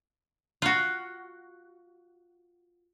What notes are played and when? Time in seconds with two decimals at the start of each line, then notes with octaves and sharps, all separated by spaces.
0.62 F4 F#4